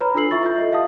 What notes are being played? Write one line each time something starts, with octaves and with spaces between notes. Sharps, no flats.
B4 C#5 A#5 B5
D4 F4 A4 E6 C7 F#7
E4 F4 E5 C#6 A6
F4 E5 G6
A4 D#5
G4 E5 F5 A5 D#6